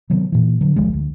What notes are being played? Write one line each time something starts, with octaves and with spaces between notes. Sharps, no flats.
C3 D#3 F#3 B3
A#2 E3
D3 F#3
D1 G#1 F3 G#3
D2